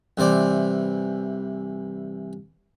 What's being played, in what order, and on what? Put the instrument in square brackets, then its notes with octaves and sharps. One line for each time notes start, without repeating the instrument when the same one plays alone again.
[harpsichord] C2 E3 C5 D5